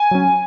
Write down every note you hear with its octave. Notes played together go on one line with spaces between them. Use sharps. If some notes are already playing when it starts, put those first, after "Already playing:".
Already playing: G#5
F#3 C#4